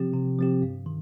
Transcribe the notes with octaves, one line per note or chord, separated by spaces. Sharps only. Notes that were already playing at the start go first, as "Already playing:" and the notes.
Already playing: C3 F3 C4 G4
C3
F3 C4 G4
G2
D#3